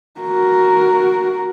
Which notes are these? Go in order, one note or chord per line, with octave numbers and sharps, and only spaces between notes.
F#4 A#4